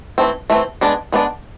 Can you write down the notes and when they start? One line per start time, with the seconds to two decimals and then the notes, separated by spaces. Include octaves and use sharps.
0.18 E3 A3 C4
0.50 E3 A3 C4
0.81 G#3 B3 D4
1.12 G#3 B3 D4